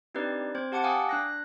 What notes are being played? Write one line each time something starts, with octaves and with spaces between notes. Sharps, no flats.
C4 D4 D#4 G4 B4 D5
C4 C5 G#6
G4 F#5 A5 D6 C#7
F5 G5 G#5 D6 D#6
D4 F#6 A#6